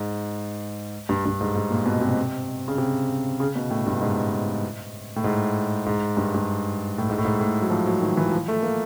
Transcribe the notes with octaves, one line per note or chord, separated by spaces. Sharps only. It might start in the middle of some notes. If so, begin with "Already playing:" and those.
Already playing: G#2
G2
G2
G#2
G#2
A#2
B2
C3
C#3
C3
C#3
B2
A2
G2
G#2
A2
G#2
G#2
G2
G2
A2
G#2
A2
G#2
A2
F#3
F3
F#3
D#3
E3
F3
A3
A#3